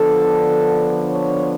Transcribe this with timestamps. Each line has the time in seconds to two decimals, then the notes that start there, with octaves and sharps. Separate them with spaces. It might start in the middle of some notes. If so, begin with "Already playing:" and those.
Already playing: D3 F3 B3 D4 A4
1.07 C#5